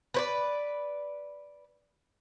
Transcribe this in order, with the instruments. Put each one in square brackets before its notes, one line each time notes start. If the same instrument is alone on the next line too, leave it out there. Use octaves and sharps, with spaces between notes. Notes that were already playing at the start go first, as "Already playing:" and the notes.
[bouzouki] B4 C5 D5